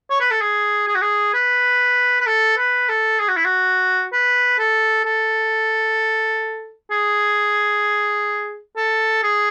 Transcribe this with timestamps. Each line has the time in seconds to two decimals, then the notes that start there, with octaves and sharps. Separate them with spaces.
0.10 C#5
0.20 B4
0.31 A4
0.41 G#4
0.87 G#4
0.95 F#4
1.01 G#4
1.34 B4
2.20 B4
2.26 A4
2.57 B4
2.89 A4
3.19 G#4
3.28 F#4
3.36 E4
3.45 F#4
4.12 B4
4.59 A4
5.05 A4
6.91 G#4
8.76 A4
9.23 G#4